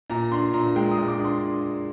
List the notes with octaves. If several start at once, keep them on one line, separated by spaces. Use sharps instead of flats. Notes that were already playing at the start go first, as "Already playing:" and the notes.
A#2 A#5
D4 C6
A#2 A#5
G#3 G5
D#6
A#2
D6
D4
C6